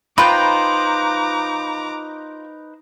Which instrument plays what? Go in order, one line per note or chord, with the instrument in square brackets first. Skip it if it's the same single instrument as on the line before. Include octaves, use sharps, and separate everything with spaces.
[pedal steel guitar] D#4 B4 C5 [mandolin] F4 G5 [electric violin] A#5 D6 [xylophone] B5